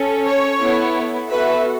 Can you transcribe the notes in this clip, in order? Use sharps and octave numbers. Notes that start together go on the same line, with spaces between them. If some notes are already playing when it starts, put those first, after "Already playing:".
Already playing: C#4 A4
C#5
B3 E4 A4
B3 F#4 A4 B4 E5